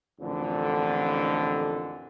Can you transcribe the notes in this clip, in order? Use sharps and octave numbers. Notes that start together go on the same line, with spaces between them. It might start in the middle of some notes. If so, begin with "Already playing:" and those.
A1 F2 A#2 D3